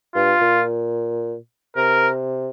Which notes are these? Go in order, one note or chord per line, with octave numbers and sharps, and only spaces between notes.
G2 F4
A#2
C3 A#4